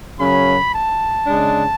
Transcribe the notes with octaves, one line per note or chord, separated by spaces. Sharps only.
F#2 C#3 F#3 C#4 B5
A5
C#3 G#3 D4